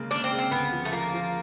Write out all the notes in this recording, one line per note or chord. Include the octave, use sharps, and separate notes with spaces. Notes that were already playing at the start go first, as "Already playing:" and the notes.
Already playing: C#3 G#3 A#3
C#3 D4
C4
C#3
C4
D2 B3
F3
A3
F3 A#3
F3